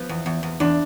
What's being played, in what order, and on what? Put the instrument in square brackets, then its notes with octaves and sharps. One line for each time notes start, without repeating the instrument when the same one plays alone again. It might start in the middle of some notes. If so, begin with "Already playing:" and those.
Already playing: [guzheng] F3 [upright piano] B3
[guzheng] E2
E2
E2
[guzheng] E2 [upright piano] D4